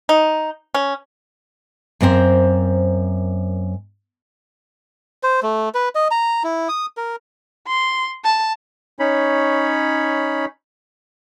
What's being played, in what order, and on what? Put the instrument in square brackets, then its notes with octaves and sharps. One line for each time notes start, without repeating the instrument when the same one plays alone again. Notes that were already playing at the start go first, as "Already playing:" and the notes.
[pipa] D#4
C#4
[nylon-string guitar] F#2 A#3 C4 A#4 C5
[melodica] C5
A3
B4
D#5
A#5
E4
D#6
A#4
[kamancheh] C6
A5
[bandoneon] C#4 D#4 C#5 B5